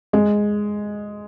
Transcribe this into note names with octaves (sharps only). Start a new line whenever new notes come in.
G#3